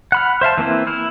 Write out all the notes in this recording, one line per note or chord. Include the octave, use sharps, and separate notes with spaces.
F#5 B5 F6
C5 E5 F5 A5
E3 A#3 C4 E4
E4 F6